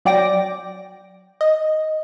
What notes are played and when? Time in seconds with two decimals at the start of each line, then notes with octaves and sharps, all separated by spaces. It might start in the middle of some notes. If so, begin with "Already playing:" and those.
0.05 F#3 D5 G5 D6 A#6
1.41 D#5